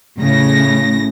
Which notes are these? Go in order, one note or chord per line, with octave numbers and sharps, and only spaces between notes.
A2 C#3 A#6